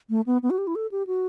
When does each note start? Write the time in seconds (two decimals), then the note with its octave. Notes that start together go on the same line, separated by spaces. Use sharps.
0.10 A3
0.26 B3
0.43 B3
0.50 F#4
0.58 G4
0.67 E4
0.75 A4
0.92 G4
1.07 F#4